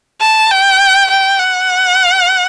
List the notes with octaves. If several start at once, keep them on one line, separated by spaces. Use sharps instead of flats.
A5
G5
G5
F#5